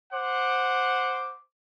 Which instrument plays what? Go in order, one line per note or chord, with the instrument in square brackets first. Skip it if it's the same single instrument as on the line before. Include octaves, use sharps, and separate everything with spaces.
[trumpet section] C5 F#5 D6